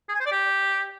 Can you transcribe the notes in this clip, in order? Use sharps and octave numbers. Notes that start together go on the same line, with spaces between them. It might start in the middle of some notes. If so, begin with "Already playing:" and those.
G#4
G#5
C5
D5
G4